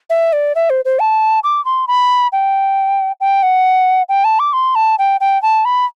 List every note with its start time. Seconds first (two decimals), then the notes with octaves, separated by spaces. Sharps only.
0.10 E5
0.33 D5
0.55 E5
0.70 C5
0.85 C5
0.99 A5
1.43 D6
1.65 C6
1.87 B5
2.32 G5
3.20 G5
3.43 F#5
4.09 G5
4.24 A5
4.39 D6
4.53 C6
4.75 A5
4.99 G5
5.21 G5
5.43 A5
5.65 B5